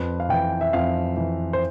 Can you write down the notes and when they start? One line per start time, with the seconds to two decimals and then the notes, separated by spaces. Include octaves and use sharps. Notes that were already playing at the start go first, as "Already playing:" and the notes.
Already playing: F2 B4
0.20 F5
0.29 E3 G5
0.61 E5
0.73 F2 F5
1.17 E3
1.53 C5